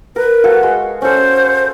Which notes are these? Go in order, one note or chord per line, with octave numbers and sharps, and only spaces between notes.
A#4 B4
F#4 A4 F5
G#3
C#4 A4 C5